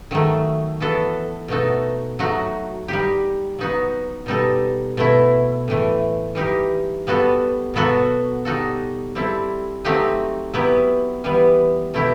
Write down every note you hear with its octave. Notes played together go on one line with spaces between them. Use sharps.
D#3 F#3 A3
E3 B3 F#4 A4
B2 A3 D#4 F#4 A4
F#3 A3 D#4 F#4
G3 D#4 G4
F#3 B3 D#4 F#4
B2 G3 D#4 A4
B2 A3 E4
A2 E3 A3
E3 G3 D#4 G4
G3 B3 F#4 A4
B2 F#3 B3 F#4 A4
G3 D#4 F#4 A4
G3 C4 E4 A4
F#3 A3 C4 D#4 G4
F#3 B3 E4 G4
E3 G3 B3
B2 A3 E4 G4